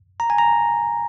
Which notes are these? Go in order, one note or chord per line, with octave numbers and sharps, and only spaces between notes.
A#5
G#5
A#5